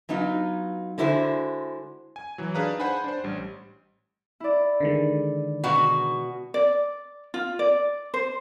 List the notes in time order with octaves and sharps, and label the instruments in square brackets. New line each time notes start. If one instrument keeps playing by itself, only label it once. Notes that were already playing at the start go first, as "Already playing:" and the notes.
[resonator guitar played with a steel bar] F#3 B3 D#4 F4
D3 G#3 D4 E4 F#4 C5
[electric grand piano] G#5
E3 F#3
D4 D#4 G#4 B4 F5 A#5
C5 F#5 G#5 B5
D4 C5
A1 G3
[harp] E4 D5
[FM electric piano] D3 D#3 G#3
[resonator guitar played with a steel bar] B2 F#4
[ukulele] D5
F4
D5
C5